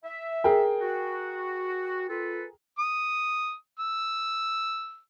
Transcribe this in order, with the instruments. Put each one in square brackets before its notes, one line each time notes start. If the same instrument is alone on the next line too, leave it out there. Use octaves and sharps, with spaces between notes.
[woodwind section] E5
[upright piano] G#4 A#4 G5
[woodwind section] F#4
F4 A4 B4
[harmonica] D#6
E6